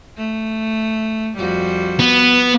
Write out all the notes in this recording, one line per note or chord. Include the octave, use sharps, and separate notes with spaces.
A3
F2 G3 F#4
B3